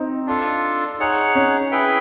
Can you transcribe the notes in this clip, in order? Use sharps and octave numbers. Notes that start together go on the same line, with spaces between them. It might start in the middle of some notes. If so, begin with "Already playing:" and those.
Already playing: C4 D#4
D4 F4 A4
D#4 G#4 C#5 F#5
C#4
E4 G#4 B4 E5 G5